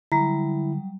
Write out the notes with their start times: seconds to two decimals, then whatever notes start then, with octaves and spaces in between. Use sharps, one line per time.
0.12 D3 F#3 G3 E4 A#5